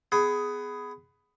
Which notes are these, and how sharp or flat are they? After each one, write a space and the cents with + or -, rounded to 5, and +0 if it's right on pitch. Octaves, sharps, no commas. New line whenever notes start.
B3 +15 G#4 +5